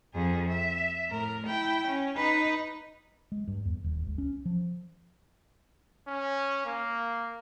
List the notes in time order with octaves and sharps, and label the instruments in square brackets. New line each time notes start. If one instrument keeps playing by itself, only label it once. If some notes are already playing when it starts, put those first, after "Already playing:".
[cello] F2 G#4
E5
A2 A#4
E4 G5
C#4
D#4 B4
[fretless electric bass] G#3
G2
E2
D#1
C#2
C#4
F3
[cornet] C#4
A#3